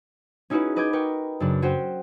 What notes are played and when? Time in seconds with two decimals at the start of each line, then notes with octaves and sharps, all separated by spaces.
0.50 C#4 D#4 E4 F#4 G#4 B4
0.76 B4 D#5 G#5 D6 G6 G#6
0.93 A#4 B4 G5 C#6
1.40 F#2 C#3 D4
1.62 C#4 F#4 C5 G5